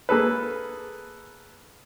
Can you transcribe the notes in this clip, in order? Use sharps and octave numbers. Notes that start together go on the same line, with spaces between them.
A#3 G#4 A4 B4